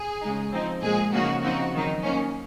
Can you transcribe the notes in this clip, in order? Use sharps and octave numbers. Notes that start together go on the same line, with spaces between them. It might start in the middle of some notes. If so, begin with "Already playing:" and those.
Already playing: G#4
C#3 G#3 D#4
F3 C4 D#4
A#2 F3 G#3 G#4
C#3 F3 A#3 D#4 F#4
C#3 F3 C4 D#4 F#4
D#3 F#3 C4 D#4
D#3 A#3 C#4